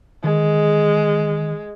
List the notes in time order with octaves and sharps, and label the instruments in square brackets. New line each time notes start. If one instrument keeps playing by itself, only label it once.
[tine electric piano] D#3 [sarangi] G#3